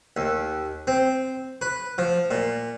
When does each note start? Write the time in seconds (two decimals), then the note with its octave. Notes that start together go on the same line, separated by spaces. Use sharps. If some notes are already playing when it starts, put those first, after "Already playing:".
0.17 D#2
0.87 C4
1.62 B4
1.98 F3
2.31 A#2